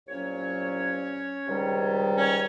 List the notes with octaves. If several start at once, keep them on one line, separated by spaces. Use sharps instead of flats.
C2 A#2 F#3 C#4 C#5
C#2 C3 D#3 G3
C#4 C#5